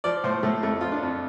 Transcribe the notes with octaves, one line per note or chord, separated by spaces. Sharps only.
F3 D5
A2 C5
A2 A3
F2 A3
F3 F4
D4
F2